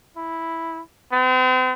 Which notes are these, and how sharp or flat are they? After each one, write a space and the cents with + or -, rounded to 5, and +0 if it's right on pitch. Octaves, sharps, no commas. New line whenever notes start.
E4 -5
C4 -40